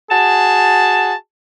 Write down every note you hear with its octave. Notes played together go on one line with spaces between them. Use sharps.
F#4 G#4 A5